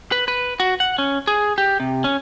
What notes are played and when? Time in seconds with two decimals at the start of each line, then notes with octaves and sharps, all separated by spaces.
0.12 B4
0.28 B4
0.60 F#4
0.80 F#5
0.98 C#4
1.27 G#4
1.58 G4
1.80 C3
2.04 C#4